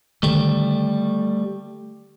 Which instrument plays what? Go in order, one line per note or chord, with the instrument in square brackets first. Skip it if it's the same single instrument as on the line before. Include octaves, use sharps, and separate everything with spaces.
[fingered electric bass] D3 D#3 [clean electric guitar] G3 A3